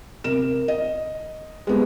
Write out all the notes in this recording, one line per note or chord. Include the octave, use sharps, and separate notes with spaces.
C3 A#4 E7
D#5
G#3 B3 G4